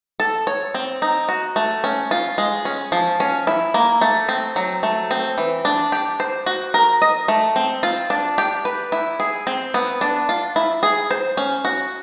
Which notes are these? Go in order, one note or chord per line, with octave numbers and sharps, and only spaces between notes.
A4
C#5
C4
D#4
F#4
A3
C#4
F4
G#3
C#4
F3
C#4
E4
A#3
A3
C4
F#3
A3
C4
E3
D4
G4
C5
F#4
A#4
D#5
A3
C4
F4
D4
G4
B4
E4
G#4
C4
B3
D4
F4
E4
G#4
C5
C#4
F#4